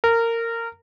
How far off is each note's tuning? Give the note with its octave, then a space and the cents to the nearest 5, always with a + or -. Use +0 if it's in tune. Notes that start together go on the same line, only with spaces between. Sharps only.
A#4 -20